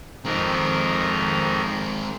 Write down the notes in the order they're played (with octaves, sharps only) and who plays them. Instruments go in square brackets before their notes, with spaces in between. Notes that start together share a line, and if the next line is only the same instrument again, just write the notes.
[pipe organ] F2 D#3 A#4 [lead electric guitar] G#3 C4